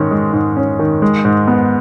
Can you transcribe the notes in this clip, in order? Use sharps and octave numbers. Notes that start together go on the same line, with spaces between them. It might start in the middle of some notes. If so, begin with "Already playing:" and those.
Already playing: G#2 D#3 C#4
G#3
G#2
C#4
D#3
G#3
G#2
B3